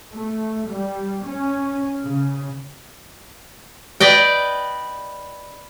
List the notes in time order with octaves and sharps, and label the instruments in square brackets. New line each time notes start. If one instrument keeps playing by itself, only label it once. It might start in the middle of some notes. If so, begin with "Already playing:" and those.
[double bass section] A3
G3
C#4
C#3
[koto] B4 D5 D#5 G5